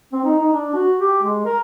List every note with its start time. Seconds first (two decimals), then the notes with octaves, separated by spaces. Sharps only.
0.13 C4
0.25 D#4
0.39 D#4
0.53 D4
0.75 F#4
1.00 G4
1.23 G#3
1.46 A#4